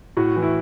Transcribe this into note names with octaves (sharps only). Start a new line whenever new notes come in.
A2 F#4
E3
E4